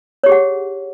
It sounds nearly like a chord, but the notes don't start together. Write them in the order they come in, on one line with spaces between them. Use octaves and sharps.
C#5 G4 G#4 F#5